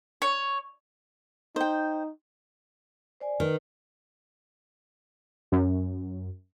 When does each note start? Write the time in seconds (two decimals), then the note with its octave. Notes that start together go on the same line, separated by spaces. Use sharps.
0.22 C#5
1.56 D#4 C5 G5
3.21 C5 D5 G#5
3.40 D#3 B4
5.52 F#2